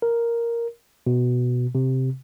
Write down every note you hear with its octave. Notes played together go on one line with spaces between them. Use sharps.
A#4
B2
C3